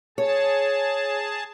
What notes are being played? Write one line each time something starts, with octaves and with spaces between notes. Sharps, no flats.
G#4 C#5 A5